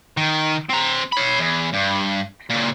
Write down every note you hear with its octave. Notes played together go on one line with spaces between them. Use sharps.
D#3
C4 A#5
C#5 B5
E2
G2
A#2 C#3